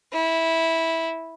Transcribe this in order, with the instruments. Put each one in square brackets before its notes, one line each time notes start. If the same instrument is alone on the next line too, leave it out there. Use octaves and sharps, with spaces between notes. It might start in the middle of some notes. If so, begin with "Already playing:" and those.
[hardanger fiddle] E4